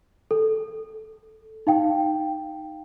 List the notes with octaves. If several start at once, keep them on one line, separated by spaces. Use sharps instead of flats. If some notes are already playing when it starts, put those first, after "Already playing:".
A4
D#4 F5 G5